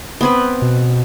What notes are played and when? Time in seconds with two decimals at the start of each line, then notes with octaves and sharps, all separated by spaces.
0.21 B3 C4 B4
0.62 B2